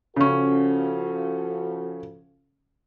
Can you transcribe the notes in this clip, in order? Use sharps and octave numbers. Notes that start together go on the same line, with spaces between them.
C#3 F3 C#4 F#4 A4